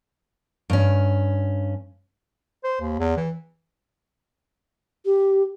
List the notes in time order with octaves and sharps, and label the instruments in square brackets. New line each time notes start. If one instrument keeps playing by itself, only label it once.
[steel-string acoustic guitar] G2 C#4
[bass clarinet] C5
D#2
E2
E3
[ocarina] G4